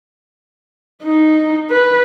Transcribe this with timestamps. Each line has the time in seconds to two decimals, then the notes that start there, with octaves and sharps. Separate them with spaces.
1.03 D#4
1.70 B4